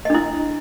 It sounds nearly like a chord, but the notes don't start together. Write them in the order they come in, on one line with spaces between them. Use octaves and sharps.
D#5 D4 E4